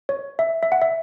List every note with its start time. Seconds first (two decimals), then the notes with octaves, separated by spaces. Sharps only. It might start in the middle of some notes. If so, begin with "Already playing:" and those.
0.09 C#5
0.39 E5
0.63 E5
0.72 F#5
0.82 E5